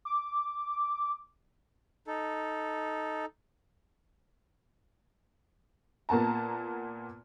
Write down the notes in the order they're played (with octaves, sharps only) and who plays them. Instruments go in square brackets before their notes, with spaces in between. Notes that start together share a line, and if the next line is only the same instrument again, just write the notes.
[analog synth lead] D6
[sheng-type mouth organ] D#4 A4
[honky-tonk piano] A#2 A#3 B3 A5 A#5